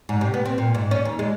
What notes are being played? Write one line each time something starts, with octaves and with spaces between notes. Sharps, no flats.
G#2
C3
B3
C4
A#2
G#2
C#4
D#2
G#3